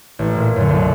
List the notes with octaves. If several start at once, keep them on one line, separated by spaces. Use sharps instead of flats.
A1
A#2
F#2 D3
B1